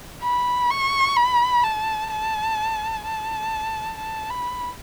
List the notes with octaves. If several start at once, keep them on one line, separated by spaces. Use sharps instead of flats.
B5
C#6
B5
A5
A5
A5
A5
B5